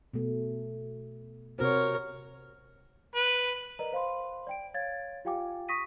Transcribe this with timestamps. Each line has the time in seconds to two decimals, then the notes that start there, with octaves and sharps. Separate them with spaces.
0.13 B2 A3
1.59 C3 F#4 A#4 C5 C#5
3.16 B4
3.79 A#4 B4 D5 D#5 A#5
3.92 C5 F5 B5 C6
4.47 D5 G5 D7
4.74 C#5 F5 G#6 A6
5.25 F4 G4 F5 G5 G#5 D6
5.69 C#6 D#6 A#6 B6 D#7